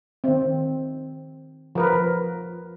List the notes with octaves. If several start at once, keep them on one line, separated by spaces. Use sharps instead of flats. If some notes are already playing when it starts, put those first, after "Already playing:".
D#3 C4
F3 A#4 B4